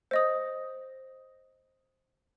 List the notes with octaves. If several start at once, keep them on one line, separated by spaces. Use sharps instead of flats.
C5 D#5 D#6